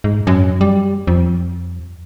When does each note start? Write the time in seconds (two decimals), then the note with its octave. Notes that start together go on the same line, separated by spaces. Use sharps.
0.04 G#2
0.27 F#2
0.61 G3
1.07 F2